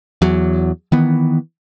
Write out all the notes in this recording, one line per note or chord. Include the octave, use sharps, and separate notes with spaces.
E2 F#3
D#3 E3 B3